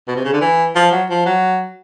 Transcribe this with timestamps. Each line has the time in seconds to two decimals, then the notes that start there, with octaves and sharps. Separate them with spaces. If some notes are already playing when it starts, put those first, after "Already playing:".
0.08 B2
0.16 C3
0.25 C#3
0.33 D3
0.41 E3
0.76 F3
0.92 F#3
1.10 F3
1.26 F#3